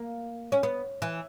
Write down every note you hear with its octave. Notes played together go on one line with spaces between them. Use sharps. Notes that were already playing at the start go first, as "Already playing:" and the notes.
Already playing: A#3
C#4
B3
E3